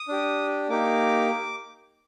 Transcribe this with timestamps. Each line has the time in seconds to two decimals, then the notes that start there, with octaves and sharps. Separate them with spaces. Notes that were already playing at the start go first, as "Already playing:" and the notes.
Already playing: D#6
0.08 D4 G4
0.69 A#3 D#4 G4 D6